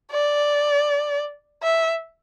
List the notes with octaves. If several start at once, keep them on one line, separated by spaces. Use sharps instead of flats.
D5
E5